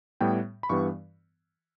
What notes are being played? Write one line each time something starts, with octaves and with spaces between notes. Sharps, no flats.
A2 G3 B3 G5
B5
G2 E3 G3 B3 C#6